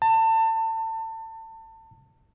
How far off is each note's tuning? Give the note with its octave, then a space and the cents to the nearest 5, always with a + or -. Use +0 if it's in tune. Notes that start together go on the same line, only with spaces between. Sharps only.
A5 +30